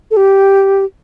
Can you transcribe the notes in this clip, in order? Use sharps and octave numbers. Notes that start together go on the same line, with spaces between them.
A4
G4